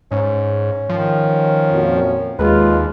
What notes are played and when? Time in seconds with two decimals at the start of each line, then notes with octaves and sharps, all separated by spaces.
0.12 G#2 C#4
0.89 D#3 F3
1.72 F2 A#2 F#4
2.39 D#2 G#3 F4 B4